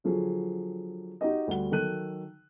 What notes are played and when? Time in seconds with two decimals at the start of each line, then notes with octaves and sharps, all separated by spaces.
0.04 D3 F3 F#3 G#4
1.21 D#4 F#4 G4 D#5
1.47 D2 G3 F#5 G7
1.71 D#3 F#3 A4 F#6 D#7